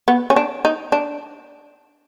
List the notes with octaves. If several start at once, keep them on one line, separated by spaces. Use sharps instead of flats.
B3
C#4
D4
D#4
D4